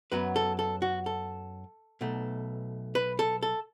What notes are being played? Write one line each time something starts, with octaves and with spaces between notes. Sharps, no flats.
F#2 F#3 B3 B4
A4
A4
F#4
A4
B1 B2 A3
B4
A4
A4